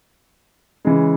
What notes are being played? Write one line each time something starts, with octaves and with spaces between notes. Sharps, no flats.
C#3 E3 G#3